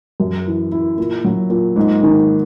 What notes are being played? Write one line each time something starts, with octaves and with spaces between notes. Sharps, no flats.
F#2
E3
E4
A#2
F#3
A#2
G#2
D#3